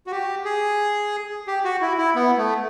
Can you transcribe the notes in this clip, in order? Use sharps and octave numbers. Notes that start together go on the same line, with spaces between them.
F#4
G4
G#4
G4
F#4
E4
E4
B3
A3